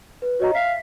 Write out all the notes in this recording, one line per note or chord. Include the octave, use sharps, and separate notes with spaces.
B4
F#4 C#5 D#5 A#5
E5 F5 B6 C7